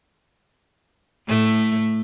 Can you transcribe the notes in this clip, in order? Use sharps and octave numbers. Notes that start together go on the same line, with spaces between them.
A2 A3